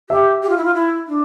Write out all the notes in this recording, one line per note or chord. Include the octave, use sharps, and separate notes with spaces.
G4 E5
G4
F4
E4
F4
E4
D4